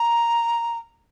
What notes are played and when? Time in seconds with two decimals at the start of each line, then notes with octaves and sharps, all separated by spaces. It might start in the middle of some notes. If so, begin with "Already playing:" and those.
Already playing: A#5